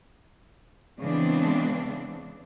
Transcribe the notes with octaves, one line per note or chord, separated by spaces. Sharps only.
C#3 E3 G#3 B3 C4 D4